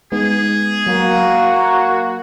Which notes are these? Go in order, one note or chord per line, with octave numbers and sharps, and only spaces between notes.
G#3 B3 D#4 G#4
F#3 A#3 F#4